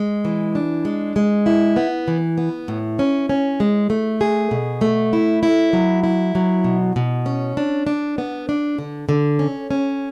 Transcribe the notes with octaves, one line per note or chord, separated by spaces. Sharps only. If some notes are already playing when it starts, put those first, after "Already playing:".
Already playing: G#3
E3
D4
G#3
G#3
E4
B3
E3
B3
A2
C#4
C#4
G#3
A3
G#4
B2
A3
E4
E4
F#3
E4
F#3
B2
B2
C#4
D4
D4
B3
D4
D3
D3
C#4
C#4